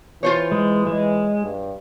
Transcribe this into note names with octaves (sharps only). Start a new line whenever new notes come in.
E3 F4 C5 C#5
G#3
G#3
G2